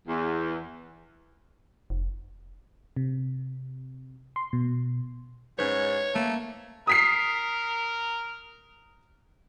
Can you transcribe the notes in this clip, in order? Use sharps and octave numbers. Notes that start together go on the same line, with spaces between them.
E2
F1
C3
C6
B2
G#2 C#4 B4 C#5
A3 A#3
A#4 D#6 B6 C7